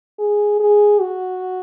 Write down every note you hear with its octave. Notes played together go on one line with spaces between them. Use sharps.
G#4
G#4
F#4